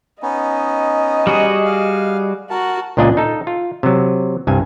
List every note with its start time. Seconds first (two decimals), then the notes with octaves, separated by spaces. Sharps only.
0.23 B3 C#4 D#4 D#5
1.27 G3 F#4 G#4
1.65 F5
2.50 F#4 A#4 A5
2.97 C#2 A#2 D4 F4 D#5 G#5
3.17 D#4 A4
3.47 F4
3.83 C3 F#3
4.47 C2 G2 G#5